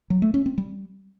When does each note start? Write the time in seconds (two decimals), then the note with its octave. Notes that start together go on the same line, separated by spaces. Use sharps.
0.10 F#3
0.22 A3
0.34 C#4
0.46 C4
0.58 G3